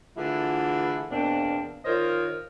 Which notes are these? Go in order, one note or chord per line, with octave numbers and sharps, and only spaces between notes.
D3 E3 A3 E4 F4 G#4
E2 B2 A#3 C4 D4
D#3 F4 A#4 C5 C#5 D#5